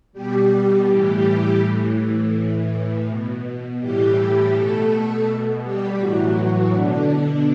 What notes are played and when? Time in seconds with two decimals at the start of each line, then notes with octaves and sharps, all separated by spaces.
0.13 B2 G3 G4
0.87 A2 E3
1.60 A2 E3
2.33 A2 E3
3.06 B2
3.80 A2 E3 G3 G4
4.52 B2 A3 A4
5.26 B2
5.63 G3 G4
5.99 A2 E3 F#3 F#4
6.72 B2 D3 D4